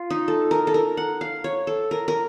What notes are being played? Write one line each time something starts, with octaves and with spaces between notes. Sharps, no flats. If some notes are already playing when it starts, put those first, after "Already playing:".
Already playing: F4
D#4
A4
A#4
A4
A#4
F#5
F5
C#5
A4
A#4
A#4